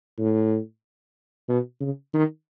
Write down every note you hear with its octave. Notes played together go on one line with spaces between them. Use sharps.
A2
B2
C#3
D#3